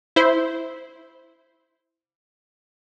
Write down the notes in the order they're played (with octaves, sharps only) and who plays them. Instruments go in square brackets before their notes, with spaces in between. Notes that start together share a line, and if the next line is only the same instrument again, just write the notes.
[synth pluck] E4 C5